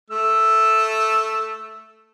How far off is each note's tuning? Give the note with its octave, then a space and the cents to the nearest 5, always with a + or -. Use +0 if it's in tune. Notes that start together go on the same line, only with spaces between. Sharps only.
A3 +0 E6 +0